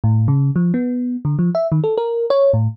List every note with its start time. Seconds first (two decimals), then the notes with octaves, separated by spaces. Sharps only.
0.04 A2
0.28 C#3
0.56 F3
0.74 B3
1.25 D3
1.39 F3
1.55 E5
1.72 D#3
1.84 A4
1.98 A#4
2.30 C#5
2.54 A2